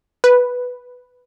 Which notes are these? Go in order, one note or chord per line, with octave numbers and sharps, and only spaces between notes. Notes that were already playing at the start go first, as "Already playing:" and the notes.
B4